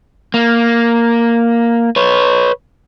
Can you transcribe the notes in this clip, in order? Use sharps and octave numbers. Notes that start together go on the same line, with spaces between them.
A#3
B4 C#5